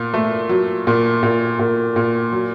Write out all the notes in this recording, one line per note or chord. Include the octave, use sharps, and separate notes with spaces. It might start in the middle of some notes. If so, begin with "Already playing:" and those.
Already playing: A#2
A3
F#3
A#2
A#2
A#2
A#2
F#3